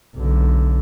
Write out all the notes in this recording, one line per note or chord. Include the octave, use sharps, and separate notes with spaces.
B1 D3